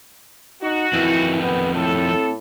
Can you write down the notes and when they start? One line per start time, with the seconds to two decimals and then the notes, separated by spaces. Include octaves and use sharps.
0.63 D#4 F#4
0.93 F2 D#3 E3 E4
1.42 B3 C4
1.76 A2 A4